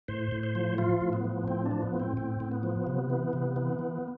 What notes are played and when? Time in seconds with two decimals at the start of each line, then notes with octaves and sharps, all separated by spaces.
0.08 A2 C5
0.32 A2
0.43 C5
0.55 F3
0.78 F3 F4
1.01 A2
1.13 B3
1.24 F3
1.48 A2 C4
1.65 D4
1.71 F3
1.82 B3
1.94 A2
2.00 C4
2.17 A2 C4
2.40 A2
2.51 B3
2.63 F3
2.87 C3
3.10 E3
3.33 C3
3.56 E3
3.79 E3